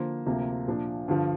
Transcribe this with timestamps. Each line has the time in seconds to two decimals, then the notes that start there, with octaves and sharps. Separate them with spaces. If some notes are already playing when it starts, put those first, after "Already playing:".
Already playing: D3 F3 A#3 F4 C5
0.26 D2 C3 F3 A#3
0.68 A#2 F3 D4
1.08 G2 D3 F3